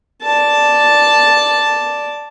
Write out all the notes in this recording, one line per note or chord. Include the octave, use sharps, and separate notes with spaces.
D5 A5